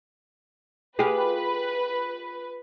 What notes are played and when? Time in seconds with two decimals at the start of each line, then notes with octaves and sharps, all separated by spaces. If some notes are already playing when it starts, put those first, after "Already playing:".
0.99 F4 G4 G#4 B4